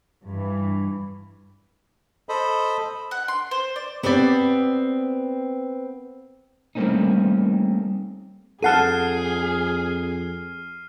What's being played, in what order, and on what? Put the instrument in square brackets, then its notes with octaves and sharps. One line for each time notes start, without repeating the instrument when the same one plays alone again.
[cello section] G2 E3
[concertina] A4 C5 D#5 B5
[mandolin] F#5
C6
C5
D5
[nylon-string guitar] B3 C4 G4 B4 D5
[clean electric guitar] G3 A3 A#3 C4 C#4 D#4
[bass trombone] F2 [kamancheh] G#4 [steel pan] A4 F#5 A5 [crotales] F6 C7 D#7